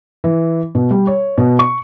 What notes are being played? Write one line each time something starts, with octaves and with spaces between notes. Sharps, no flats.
E3
B2
G3
C#5
B2
C#6